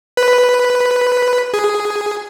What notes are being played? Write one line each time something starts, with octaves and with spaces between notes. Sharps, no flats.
B4
G#4